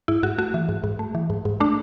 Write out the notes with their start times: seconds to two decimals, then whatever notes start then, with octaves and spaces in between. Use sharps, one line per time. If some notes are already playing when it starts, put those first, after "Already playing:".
0.08 G#2 E4
0.23 G#2 F#4
0.38 A3 F#4
0.54 E3
0.69 G#2
0.84 G#2
0.99 A3
1.15 E3
1.30 G#2
1.45 G#2
1.60 A3 D4